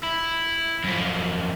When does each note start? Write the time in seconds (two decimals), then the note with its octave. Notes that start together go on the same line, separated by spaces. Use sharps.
0.03 E4
0.84 F#2 F3